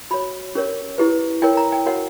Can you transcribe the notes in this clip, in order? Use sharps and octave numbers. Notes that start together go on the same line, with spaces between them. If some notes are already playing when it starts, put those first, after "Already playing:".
F#4 C#5 B5
C#4 G4 A#4 C#5
E4 G4 B4
E4 A#4 C#5 G5
A#5
G5
F#4 A#4 C#5 F#5